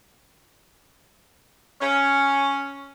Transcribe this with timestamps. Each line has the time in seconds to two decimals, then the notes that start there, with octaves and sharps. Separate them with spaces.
1.81 C#4